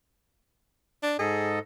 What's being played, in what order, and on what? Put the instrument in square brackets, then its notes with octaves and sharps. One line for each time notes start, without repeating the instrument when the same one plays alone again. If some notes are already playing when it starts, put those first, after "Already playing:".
[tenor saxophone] D4
[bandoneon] G#2 A4 D#5 [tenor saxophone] G#4